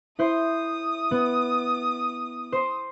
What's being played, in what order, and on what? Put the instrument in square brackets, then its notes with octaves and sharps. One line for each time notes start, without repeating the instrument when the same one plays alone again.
[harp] E4 C5 G6 [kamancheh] D#6
[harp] B3
C5